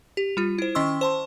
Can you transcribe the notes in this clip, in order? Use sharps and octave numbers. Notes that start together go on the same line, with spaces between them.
G4
G3 F4
E4 C5
D#3 C#4 D#5 C6 C#6 E6
C5 A5 C6